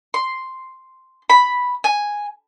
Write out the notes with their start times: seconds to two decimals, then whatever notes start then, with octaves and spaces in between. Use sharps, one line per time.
0.14 C6
1.29 B5
1.84 G#5